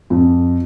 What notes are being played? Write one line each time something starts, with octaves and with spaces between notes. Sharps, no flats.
F2